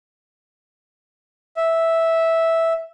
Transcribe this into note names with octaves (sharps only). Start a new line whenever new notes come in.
E5